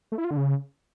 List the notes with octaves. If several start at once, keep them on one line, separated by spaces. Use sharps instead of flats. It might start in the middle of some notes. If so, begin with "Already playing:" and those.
A3
E4
F4
D3
C#3